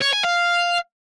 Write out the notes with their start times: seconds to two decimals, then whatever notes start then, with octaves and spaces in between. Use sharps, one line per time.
0.01 C#5
0.13 G#5
0.24 F5